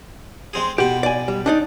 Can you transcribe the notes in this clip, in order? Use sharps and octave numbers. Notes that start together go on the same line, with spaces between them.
G#3 C4 G#4
B2 G4 B5
D5 G#5
G3
D4 D#4 D5